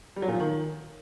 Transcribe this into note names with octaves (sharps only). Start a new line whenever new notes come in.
G3
F#3
A#2
F3
D#3